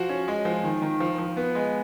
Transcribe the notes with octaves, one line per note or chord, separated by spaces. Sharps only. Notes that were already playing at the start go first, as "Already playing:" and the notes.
Already playing: F3 F#4
C#4
G#3
F3
D#3
D#3
F3
F3
B3
G#3